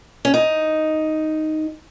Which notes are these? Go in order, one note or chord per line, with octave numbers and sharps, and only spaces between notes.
C#4
D#4